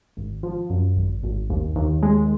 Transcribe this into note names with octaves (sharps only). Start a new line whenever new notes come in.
G#1
F3
F#2
G#1
G#1
D#2
D#2
G#3